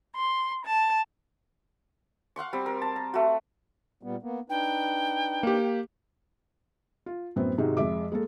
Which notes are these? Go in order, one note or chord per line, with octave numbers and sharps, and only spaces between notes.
C6
A5
F5 F#5 C6 C#6
G3 C4
A#4
A5
A#5
A3 F#4
A#2 G3 B3
A#3 B3
D4 D#4 B4 G5
A#3 G4
F4
F#2 A2 B3 C4
G#2 C3 D#3 G#3 D#4 F#4
F2 G#3 E5 D6
G#3 A#3 A4